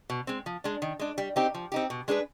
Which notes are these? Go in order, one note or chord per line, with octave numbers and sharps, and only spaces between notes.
B2
G#3 C4
F3
G#3 D4
D#3
G#3 D4
G3
C4 D#4 G4
F3
C4 D#4 G4
B2
G#3 D4 G#4 B4